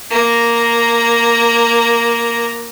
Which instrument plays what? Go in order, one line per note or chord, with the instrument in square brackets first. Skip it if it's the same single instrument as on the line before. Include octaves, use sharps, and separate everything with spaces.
[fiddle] A#3 A#5